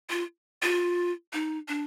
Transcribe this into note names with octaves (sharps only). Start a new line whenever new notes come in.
F4
F4
D#4
D4